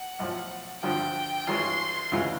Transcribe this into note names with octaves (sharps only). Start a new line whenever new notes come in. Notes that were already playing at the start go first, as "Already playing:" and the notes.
Already playing: F#5
B1 A2 F3
G#1 G2 D3 F3 G5
G#1 G2 E3 G#3 C#4 C6
D2 C#3 E3 G#3